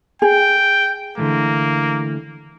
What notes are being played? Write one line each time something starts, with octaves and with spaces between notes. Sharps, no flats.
G#4 G5
D3 E3 A3 A#3